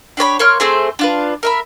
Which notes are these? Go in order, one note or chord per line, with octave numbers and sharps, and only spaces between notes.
D4 G4 C#5 B5
A#3 C#5 C6 F6
A3 C4 G#4 C5
D4 F4 B4
A#4 E5 B5